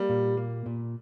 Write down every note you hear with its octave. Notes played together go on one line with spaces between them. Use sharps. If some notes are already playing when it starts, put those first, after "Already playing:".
Already playing: G3 A#3
A#2
A#3
A#2